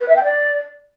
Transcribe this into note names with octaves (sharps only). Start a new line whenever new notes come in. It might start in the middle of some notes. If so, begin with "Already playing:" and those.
B4
E5
G5
D5